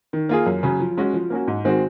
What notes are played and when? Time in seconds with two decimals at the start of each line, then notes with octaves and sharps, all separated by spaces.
0.13 D#3
0.29 A#3 F4 G#4
0.46 F#2
0.63 C#3 F#3 C#4
0.80 F3
0.97 G#3 C#4 F#4
1.14 F3
1.30 A#3 C#4 F#4
1.47 G#2
1.64 D#3 G#3 C4 F#4